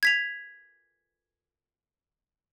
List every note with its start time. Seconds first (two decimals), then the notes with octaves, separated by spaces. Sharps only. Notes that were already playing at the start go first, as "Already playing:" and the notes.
0.03 G#6 B6 F7